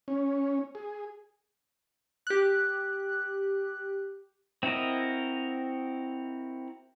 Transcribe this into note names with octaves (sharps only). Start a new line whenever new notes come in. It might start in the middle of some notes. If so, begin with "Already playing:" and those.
C#4
G#4
G4 F#6
C4 E4 F#4 A#4 D#5